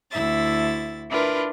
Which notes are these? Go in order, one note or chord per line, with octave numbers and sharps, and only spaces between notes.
D2 E4 E5 A6
D4 E4 F4 A#4 B4